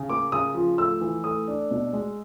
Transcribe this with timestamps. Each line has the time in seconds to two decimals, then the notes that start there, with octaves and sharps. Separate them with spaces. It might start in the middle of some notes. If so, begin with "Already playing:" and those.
Already playing: C#3
0.10 A#3 D6
0.32 C#3 D#6
0.55 F3
0.78 A3 E6
1.01 E3
1.24 A3 D#6
1.48 D4
1.71 B2
1.93 G#3